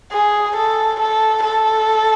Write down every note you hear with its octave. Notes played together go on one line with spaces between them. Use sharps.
G#4
A4
A4
A4